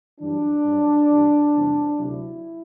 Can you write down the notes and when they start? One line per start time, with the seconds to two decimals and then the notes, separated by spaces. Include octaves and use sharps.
0.20 F#2 E3 G3 D4
0.64 G2 F#3
1.09 G2 E3 G3
1.53 E2 C3 G3
1.98 D2 C3 F#3 E4